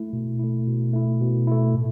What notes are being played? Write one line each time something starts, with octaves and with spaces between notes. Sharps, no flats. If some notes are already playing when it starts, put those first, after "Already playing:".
Already playing: A3 E4
B2
A3 E4
B2
A3 E4
B2
A3 E4
A2